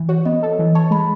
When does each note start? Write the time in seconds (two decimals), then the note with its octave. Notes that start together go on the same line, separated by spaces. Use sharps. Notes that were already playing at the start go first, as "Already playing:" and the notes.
Already playing: E3
0.09 F#4 C#5
0.25 B3 D#5
0.43 A4
0.59 E3
0.75 C#5 A5
0.91 G#3 B5